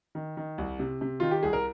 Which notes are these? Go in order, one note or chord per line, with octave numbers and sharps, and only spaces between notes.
D#3
D#3
C2
C3
C3
D#3 F4
G4
C2 G#4
A#4